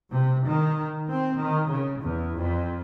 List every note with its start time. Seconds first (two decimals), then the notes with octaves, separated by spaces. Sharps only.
0.12 C3
0.46 D#3
1.09 C4
1.38 D#3
1.68 C#3
2.00 E2
2.38 F2